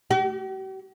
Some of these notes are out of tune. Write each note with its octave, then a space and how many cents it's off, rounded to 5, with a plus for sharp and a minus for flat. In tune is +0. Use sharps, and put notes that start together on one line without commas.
G4 -45